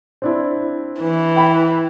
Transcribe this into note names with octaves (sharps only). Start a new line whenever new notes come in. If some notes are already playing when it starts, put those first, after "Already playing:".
C4 D4 E4
E3
G5 B5